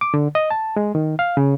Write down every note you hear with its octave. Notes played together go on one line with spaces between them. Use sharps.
D6
D3
D#5
A5
G#3
D#3
F5
C#3